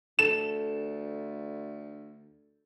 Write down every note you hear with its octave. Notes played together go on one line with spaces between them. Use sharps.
D2 A4 E7